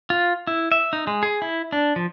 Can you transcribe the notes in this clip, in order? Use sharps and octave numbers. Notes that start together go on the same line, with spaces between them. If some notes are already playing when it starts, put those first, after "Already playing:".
F4
E4
E5
D#4
G#3
G#4
E4
D4
F3